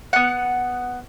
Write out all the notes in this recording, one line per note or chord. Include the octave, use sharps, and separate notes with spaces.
B3 F#5